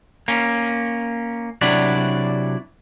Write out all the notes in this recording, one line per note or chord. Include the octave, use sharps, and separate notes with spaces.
A#3 C#4
C3 F#3 D4 E4 F#4 D5